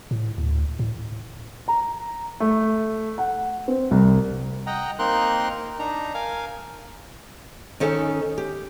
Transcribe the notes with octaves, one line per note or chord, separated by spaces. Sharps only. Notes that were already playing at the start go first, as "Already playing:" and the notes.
A2
D2
A2
A#5
A3
F#5
C4
C2
D#5 F#5 G5 A#5
A#3 C4 D#4 A#4 C6 F#6
D4 D#4 A#5
A#4 F5 G#5
D#3 C#4 D#4 A4 G#5
G4